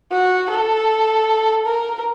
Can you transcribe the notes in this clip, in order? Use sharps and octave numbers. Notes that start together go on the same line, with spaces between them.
F#4
A4
A#4